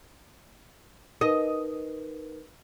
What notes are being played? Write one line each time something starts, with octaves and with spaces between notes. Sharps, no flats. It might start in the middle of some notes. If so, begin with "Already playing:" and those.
D#4 A#4 B4 D#5